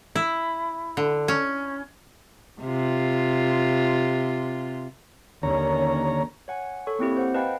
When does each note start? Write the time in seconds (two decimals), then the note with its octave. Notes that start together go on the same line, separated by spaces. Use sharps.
0.15 E4
0.97 D3
1.28 C#4
2.62 C3 F4
5.43 D#2 D3 C#4 C#5 A#5
6.48 C#5 F#5 G#5
6.87 A4 C#5 C#6
6.99 A#3 C4 E4 G4
7.17 C5 F#5
7.34 B4 D#5 F5 G5 A5 B5